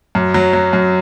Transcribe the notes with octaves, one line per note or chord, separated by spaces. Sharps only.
F#2
F#3
F#3
F#2